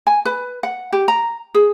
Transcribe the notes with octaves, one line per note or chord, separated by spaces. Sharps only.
G#5
B4
F#5
G4
A#5
G#4